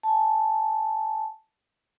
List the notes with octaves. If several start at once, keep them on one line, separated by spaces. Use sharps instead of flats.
G#5 A5